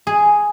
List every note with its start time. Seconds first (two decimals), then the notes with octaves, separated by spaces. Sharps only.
0.07 G#4